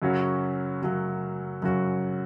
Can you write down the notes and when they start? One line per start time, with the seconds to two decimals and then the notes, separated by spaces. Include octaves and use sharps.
0.02 F#2 C#3 F#3 C#4 F#4
0.82 F#2 C#3 F#3 C#4 F#4
1.62 F#2 C#3 F#3 C#4 F#4